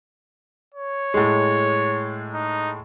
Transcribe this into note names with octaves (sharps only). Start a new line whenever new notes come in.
C#5
A2 G#3
D#4